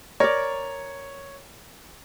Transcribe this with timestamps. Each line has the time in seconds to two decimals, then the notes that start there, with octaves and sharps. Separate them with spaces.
0.20 A#4 C#5 D5